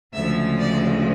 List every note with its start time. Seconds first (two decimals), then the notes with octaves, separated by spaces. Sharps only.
0.14 D2 C#3 F3 G#3 E5
0.59 D5